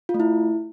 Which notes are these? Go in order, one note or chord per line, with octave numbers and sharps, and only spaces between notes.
F4
A3
E4